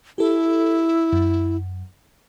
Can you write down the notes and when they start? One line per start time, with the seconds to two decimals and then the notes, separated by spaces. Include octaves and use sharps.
0.18 E4 G4 A4
1.13 F#2